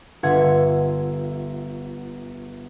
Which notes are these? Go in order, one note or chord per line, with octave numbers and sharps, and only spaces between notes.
G1 F4 A4 E5 F#5 G#6